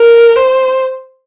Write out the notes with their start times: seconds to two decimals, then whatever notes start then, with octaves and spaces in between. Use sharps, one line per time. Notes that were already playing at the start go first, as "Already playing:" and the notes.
Already playing: A#4
0.36 C5